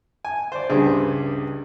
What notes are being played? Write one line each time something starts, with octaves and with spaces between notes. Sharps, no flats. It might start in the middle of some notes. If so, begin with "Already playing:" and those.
G#5
C5 D5
C#2 G2 G3 G#4